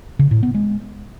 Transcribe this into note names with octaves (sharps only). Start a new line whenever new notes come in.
C#3
A2
B3
G#3